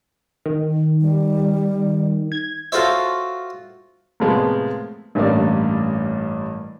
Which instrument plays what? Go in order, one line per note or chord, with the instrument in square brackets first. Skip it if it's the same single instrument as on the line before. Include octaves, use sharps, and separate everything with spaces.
[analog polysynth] D#3
[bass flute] G3
[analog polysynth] G#6
[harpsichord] F4 F#4 A4 C5 C#5 E5
[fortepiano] A2 C3 F3 G#3 A#3 B3
[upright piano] A1 G2 A#3 D5